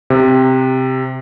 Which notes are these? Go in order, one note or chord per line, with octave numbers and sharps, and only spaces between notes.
C3